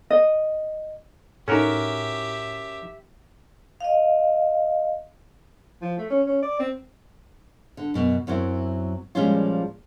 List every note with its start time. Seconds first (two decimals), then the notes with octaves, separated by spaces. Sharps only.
0.10 D#5
1.48 A2 C#4 D#4 F#4 G4 A4 A#4 E5
3.81 D#5 F5
5.82 F3
5.98 A3
6.10 C#4
6.26 C#4
6.42 D5
6.59 C4
7.77 D3
7.94 F#2 B2
8.27 F#2 F#3 C4 E4
9.15 A#2 F3 G3 G#3 C#4 F4